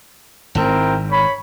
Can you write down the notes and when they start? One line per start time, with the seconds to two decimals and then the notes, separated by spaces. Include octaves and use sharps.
0.55 G#1 G#2 C4 E4 A#4
1.10 C#5 B5